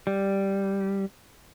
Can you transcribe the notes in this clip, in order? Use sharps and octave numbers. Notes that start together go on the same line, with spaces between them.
G3